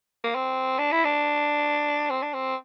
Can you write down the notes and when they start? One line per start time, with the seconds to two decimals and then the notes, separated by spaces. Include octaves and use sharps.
0.24 A#3
0.35 C4
0.79 D4
0.92 E4
1.05 D4
2.10 C4
2.22 D4
2.34 C4